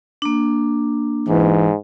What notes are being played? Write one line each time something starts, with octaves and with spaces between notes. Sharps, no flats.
A#3 D4
G#2 E3